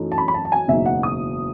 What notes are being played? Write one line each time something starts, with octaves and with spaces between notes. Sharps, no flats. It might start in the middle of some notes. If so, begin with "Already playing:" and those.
Already playing: F#2 E3 A3 D#4
A5
B5
B5
A5
A5
G#5
F#1 E2 B2 G#3 D#4 E5
F#5
D#6